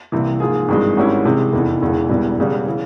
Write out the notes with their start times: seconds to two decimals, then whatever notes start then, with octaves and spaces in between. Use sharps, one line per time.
0.12 C2 C3 E3 A#3
0.40 G#2 F3 A#3 F4 G#4
0.68 G#1 G2 E3 G#3
0.97 G#1 G#2 G3 C#4 E4
1.25 C3 E3 G#3
1.53 F1 E2 E3
1.82 E1 E2 C#3 E3
2.09 E1 E2 E3 G3
2.37 E1 E2 C#3 G3
2.67 C#3 E3